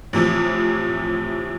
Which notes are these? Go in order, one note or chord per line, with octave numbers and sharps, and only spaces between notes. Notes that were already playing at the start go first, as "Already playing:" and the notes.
A2 C3 E3 F3